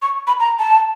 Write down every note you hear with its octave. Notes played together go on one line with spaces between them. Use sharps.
C#6
B5
A#5
A5